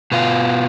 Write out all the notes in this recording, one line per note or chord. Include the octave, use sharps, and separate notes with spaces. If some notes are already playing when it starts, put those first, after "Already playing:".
B2 B3 F4